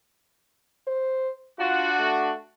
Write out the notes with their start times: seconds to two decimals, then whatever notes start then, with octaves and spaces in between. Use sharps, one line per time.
0.87 C5
1.59 D4 F4 F#4
1.99 A3